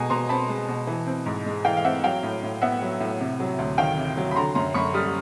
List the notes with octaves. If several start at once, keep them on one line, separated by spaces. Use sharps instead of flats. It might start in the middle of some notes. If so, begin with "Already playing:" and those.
Already playing: B2 G#3 G#5 A#5
B2 A#5 C6
C4 A5 B5
G#3
B2
E3
C4
G#2
G#3
E3 F5 G5
F5
C4 E5 F#5
F#3 F5 G5
A2
A2
B3 E5 F#5
F#3
A2
C3
F#3
D2
D#3 F5 G5
C3
F#3
B5
D3 A#5 C6
F#2 A#5 C6
F#2 B5 C#6
G3 D#6 F6